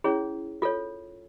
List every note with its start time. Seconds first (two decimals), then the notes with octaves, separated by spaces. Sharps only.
0.04 C#4 E4 G#4 C#5
0.62 F4 A4 C#5